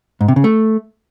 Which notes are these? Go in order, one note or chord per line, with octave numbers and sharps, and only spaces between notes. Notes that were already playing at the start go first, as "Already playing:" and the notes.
G#2
C3
C#3
A3